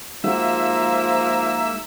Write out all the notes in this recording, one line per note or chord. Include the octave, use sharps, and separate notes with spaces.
F3 G#3 A#3 D#4 F#4 E5